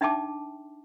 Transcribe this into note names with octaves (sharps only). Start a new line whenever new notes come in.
D4 D#4 E5 G5 A5 D6